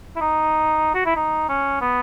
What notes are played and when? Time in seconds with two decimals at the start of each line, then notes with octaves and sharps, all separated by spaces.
0.16 E4
0.21 D#4
0.95 F#4
1.05 E4
1.16 D#4
1.49 C#4
1.81 B3